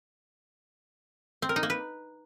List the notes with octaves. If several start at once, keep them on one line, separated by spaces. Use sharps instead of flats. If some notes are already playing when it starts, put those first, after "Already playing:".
C4
A#4
D#4
A#3
B4